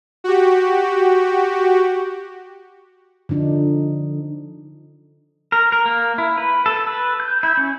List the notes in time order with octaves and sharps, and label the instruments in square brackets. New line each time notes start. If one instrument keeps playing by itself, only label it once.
[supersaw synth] F#4 G4
[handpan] D3 F3 D4 D#4
[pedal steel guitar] A#4
A#4
A#3
E4
B4
A4
B4
G6
E4
C#4